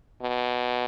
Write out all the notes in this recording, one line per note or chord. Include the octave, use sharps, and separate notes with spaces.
B2